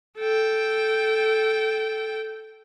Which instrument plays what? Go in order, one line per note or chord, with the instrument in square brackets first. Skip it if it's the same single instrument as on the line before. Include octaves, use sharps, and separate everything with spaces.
[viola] A4 G5